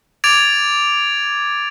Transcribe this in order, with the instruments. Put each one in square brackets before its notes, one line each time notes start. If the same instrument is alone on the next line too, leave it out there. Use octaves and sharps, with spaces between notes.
[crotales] D6 G#6 A6 D7 F7